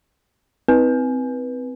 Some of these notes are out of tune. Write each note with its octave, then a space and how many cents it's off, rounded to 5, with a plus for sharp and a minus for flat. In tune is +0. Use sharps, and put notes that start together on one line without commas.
C4 -20 B4 -15